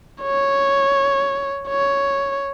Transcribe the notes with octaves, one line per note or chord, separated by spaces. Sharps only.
C#5
C#5